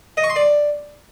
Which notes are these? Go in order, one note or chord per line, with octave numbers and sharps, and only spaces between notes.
D#5
C#6
C6
D5